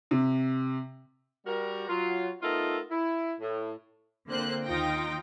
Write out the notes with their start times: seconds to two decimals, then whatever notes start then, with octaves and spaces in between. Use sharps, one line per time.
0.11 C3
1.47 G3 F#4 A#4
1.89 F#3 F4
2.43 A3 B3 D#4 F4 A4 A#4
2.91 E4
3.40 A2
4.27 D3 A#3 C4 F4 C5 F#6
4.65 D#2 D#3 D#4 F4 G5 A#6